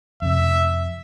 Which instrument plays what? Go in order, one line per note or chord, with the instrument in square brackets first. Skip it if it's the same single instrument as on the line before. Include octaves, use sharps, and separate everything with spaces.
[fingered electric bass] F2 C3 [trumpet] E5